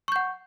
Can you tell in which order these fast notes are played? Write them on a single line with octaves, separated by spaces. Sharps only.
C#6 G6 F#5